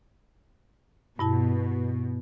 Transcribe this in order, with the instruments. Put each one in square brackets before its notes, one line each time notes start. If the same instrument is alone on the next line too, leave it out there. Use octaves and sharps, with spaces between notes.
[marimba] G2 E4 A5 [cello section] B2